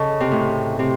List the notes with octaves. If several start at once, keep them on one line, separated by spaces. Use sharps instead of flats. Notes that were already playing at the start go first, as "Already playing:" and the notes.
Already playing: C#3 A4 D#5 A5 C#6
C3
A2
C3